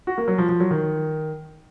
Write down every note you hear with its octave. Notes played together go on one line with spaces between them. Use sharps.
F#4
A#3
F#3
F3
F3
F#3
D#3